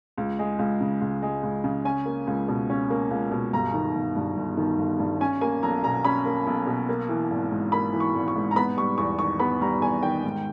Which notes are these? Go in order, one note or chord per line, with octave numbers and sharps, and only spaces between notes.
C#2
G#3
C#2
C#3
C#2
G#3
C#2
C#3
C#4 G#5
A#3
C#2
B2
C#4
A#3
C#2
B2
G1 A#5
D#3
G1
G2
G1
D#3
G1
G2
C#4 G#5
A#3 G#5
B1 A#5
B2 A#5
C#4 B5
A#3
B1
B2
A#3
E3
G#1
G#2
A#3 B5
E3
C#6
G#1
C#6
G#2
A#5
B3 B5
G3 C#6
E2 C#6
D#3 C#6
B3 B5
G3 A#5
E2 G#5
D#3 G5
G#2